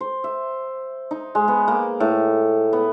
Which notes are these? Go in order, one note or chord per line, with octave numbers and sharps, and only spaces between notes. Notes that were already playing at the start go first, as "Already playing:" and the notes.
C5
E5
D#4
G#3
B3
A#3
A2
B3